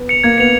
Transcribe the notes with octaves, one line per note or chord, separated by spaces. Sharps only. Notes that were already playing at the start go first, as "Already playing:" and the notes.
Already playing: B3
C#7 F7
A#3 G#6
B3 C#7 F7